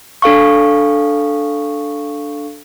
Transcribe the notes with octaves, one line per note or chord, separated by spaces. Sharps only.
D4 A4 F5 C#6